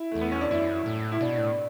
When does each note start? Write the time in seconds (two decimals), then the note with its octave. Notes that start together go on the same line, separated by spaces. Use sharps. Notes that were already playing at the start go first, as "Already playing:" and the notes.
Already playing: E4
0.12 E2 A3
0.21 B3
0.32 C#4
0.41 D4
0.51 F#2 E4
0.86 A2
1.12 E4
1.21 B2 D4
1.38 A2